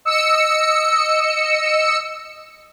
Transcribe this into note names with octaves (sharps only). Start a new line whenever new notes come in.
D#5 E6 C#7